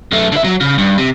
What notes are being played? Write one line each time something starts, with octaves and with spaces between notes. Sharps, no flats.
F#2 A3
D3 E5
F#3
C#3
G2
C3